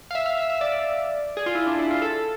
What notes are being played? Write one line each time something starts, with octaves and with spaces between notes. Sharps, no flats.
F5
E5
F5
E5
E5
D5
G#4
F4
E4
D4
E4
F4
A4